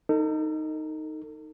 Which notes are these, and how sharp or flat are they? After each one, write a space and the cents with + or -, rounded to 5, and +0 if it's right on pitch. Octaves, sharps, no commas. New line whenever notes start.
D#4 +0 A4 +40